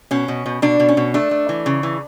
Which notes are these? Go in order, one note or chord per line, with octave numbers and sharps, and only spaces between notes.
B2 C#4
B2
B2
B2 D4
B2
C#4
B2
A3 D4
A3
E3
C#3
E3